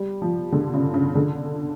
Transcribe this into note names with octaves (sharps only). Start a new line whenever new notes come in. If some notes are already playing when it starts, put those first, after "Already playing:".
Already playing: G3
F3
D3
C#3
C#3
D3